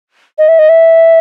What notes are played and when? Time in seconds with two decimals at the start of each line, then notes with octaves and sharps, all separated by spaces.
0.38 D#5
0.48 E5
0.59 D#5
0.69 E5